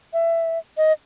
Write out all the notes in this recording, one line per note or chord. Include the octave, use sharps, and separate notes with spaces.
E5
D#5